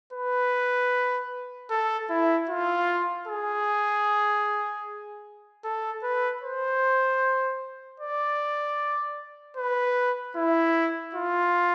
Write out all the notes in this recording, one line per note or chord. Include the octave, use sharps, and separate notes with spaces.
B4
A4
E4
F4
G#4
A4
B4
C5
D5
B4
E4
F4